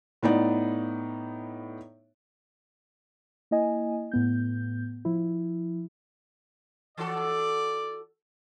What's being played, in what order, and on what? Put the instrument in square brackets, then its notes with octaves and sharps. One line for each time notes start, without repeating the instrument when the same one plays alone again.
[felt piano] A2 B3 D#4 D5
[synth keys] A#3 E4 D#5 G#5
A2 B3 G6
F3 E4
[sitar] E3 F#4 A4 [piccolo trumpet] D5